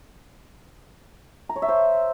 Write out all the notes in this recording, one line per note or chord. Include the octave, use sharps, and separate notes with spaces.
A#5
C#5
E5
C5